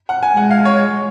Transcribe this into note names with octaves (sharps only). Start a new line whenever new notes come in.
F#5
G#5
G#3 F#5
F5
C#5